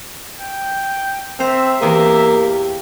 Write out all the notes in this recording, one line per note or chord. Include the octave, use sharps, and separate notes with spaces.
G5
C4 C5 E5 A#5
E2 A#3 G4 D#5